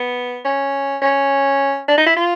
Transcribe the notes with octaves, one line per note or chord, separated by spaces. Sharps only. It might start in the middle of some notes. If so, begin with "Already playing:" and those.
Already playing: B3
C#4
C#4
D4
D#4
E4
F4